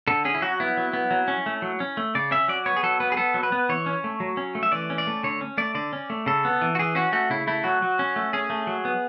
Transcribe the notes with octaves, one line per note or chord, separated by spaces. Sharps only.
D3 A4
C#4 G#4
E4
F#3 F#4
B3 E4
F#3
B3
F#3
C#4
A3
F#3
C#4
A3
C#3 D5
C#4 E5
F#3 D5
B3 C#5
G#4
F#3 A4
B3 B4
G#4
B3 A4
F#3
B4
B3
E3 C#5
C#4
A3
F#3
C#4
A3
E5
E3 D5
C#4
D5
A3
D3 C#5
C#4
A3 D5
D3 D5
C#4
A3
C#3 A4
B3
E3
F#4
E3 G#4
C#4 F#4
A3 F#4
C#3 E4
A3 E4
F#3 F#4
F#3
C#4
A3
C#4 G#4
A3
F#3
B3